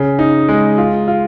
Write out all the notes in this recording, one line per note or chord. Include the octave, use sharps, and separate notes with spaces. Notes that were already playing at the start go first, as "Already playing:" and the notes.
Already playing: C#3
D#4
G#3
F4
F4